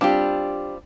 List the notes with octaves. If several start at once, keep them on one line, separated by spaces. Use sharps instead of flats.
G3 C4 D4 F4 G4